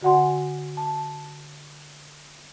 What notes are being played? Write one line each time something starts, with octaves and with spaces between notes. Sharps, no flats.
D3 F#4 D5 F#5 G#5 C6
A5